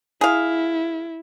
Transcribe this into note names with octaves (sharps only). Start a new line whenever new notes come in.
E4 G#4 F5